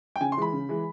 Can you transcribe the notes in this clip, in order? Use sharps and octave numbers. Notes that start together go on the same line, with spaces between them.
G5
C#3 G#5
C6
E3 G#3 B5
C#3
E3 G#3